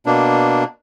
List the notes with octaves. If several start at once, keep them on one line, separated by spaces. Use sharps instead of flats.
B2 A#3 D4